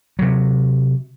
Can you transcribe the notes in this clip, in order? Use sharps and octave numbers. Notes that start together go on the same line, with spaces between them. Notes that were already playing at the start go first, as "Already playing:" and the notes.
C3 F#3